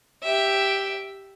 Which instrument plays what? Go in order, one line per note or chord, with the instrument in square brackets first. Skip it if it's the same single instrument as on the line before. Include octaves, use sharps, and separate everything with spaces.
[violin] G4 E5